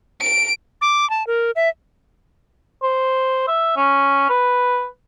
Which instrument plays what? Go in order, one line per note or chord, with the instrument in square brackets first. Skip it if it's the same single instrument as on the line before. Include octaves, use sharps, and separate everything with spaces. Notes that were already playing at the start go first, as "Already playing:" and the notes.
[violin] D7
[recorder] D6
A5
A#4
E5
[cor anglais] C5
E5
C#4
B4